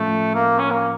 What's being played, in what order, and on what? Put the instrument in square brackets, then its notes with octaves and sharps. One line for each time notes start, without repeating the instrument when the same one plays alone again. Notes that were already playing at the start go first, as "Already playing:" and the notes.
Already playing: [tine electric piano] A2 F3 C#4 F4 [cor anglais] A3
[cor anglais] A#3
C#4
A#3